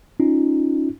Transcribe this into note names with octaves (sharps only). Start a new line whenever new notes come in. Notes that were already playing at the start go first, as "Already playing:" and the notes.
C#4 D#4 F4